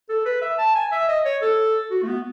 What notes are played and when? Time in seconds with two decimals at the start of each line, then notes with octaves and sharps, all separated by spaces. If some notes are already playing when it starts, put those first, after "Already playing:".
0.09 A4
0.25 B4
0.41 E5
0.58 A5
0.75 G#5
0.92 E5
1.08 D#5
1.25 C#5
1.42 A4
1.90 F#4
2.03 A3
2.07 B3